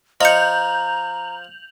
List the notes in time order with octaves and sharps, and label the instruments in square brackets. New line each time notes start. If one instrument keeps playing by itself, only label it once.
[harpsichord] F3 [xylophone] D#5 C#7 [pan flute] A#5 [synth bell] G6 F7 F#7